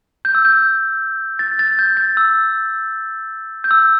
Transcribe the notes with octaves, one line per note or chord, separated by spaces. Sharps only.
G6
E6
G6
A6
A6
G6
A6
E6
G6
E6